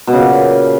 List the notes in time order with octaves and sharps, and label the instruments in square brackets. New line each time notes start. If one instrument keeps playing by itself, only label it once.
[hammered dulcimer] B2
C#3
A#2